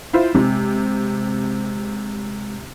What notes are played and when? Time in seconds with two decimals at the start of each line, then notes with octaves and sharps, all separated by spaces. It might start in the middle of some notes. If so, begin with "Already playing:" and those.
0.13 E4 F4 C5
0.35 C3 G#3 A3 C4